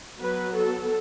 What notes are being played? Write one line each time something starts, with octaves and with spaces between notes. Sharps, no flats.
F#3 B3 B4
A4